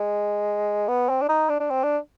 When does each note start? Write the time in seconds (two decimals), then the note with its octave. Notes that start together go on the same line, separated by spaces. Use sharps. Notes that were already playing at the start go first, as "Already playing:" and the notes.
Already playing: G#3
0.88 B3
1.09 C4
1.22 D4
1.29 D#4
1.50 D4
1.60 D4
1.70 C4
1.84 D4